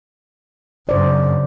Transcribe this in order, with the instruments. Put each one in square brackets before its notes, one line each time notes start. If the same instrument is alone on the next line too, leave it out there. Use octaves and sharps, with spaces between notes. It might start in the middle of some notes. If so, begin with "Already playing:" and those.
[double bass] F#2 C#3 [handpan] C5 D5